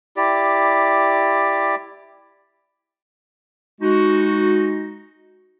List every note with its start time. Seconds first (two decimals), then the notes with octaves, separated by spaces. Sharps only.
0.17 E4 G4 D5
3.81 G#3 D#4 F#4